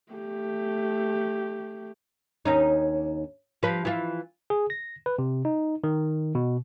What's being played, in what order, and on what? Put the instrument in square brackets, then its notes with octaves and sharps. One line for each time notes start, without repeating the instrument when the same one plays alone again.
[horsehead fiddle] A3 G4
[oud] D#2 C#4 D#4
F3 B4
E3 F4
[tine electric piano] G#4
A#6
B4
C3
D#4
D#3
B2